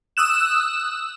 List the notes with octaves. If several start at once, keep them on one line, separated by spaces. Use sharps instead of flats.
D#6 E6 F#6 E7